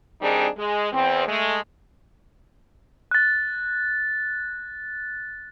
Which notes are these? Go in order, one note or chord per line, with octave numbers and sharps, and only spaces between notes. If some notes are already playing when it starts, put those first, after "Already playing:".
D#3 G3 C4 D4 D#4 G#4
G#3
E2 C4
G#3 A3
F#6 A6